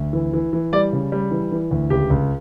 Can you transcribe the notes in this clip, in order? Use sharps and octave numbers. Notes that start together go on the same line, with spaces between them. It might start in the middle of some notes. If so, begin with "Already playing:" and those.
Already playing: D2
E3
E3
E3
G3 D5
C#3
G3
E3
E3
D2
C#2 G4
C#2